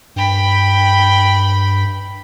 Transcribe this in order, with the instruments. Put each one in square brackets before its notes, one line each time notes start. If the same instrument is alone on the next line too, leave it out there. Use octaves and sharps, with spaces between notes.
[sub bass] G2 [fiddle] G5 B5